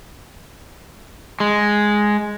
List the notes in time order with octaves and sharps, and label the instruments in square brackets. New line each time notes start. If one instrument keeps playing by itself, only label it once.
[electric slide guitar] G#3